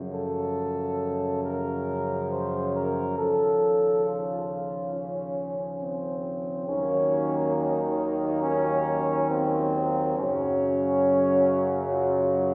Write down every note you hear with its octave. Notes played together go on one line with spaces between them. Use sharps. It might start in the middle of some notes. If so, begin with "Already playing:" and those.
Already playing: F#2 C#3 F3
A4
A#4
C5
A#4
D#2 C#3 F3 A4
F4
C#4
C4
D#2 D#3 F#3 A#3 C#4
D#4
C#4
C4
F#2 C#3 F#3 C#4
F4